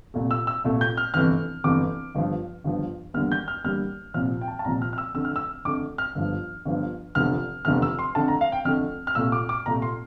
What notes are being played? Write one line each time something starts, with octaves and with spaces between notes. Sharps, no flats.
C2 A#2 A3
E6
E6
C2 A#2 A3
G6
F6
G1 F2 C3 E3 A3 F6
G1 F2 C3 E3 A3 D6
G1 G2 F3
G1 G2 F3
E2 D3 G3 A#3 F6
G6
F6
E2 D3 G3 A#3 F6
C2 A#2 F3 F6
G5
A5
A5
C2 A#2 F3 A#5
F6
F6
E6
F2 D3 A3 E6
F6
E6
F2 D3 A3 D6
F6
G1 G2 F3
G1 G2 F3
F1 E2 D3 F3 A3 F6
F1 E2 D3 F3 A3 F6
E6
C6
F2 D3 A3 A5
A#5
F5
G5
F2 D3 A3 F6
F6
C2 A#2 A3 E6
D6
D6
C2 A#2 A3 A#5
C6